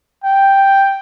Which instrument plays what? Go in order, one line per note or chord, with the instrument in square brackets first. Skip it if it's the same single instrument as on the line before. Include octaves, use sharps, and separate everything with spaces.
[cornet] G5